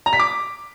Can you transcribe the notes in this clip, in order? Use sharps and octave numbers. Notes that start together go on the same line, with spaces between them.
A#5
B6
D6